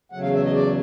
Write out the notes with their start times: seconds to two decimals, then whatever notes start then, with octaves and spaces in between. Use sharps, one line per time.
0.12 E2 C#3 F#3 A3 F#5
0.22 F5
0.34 E5
0.44 D#5
0.54 D5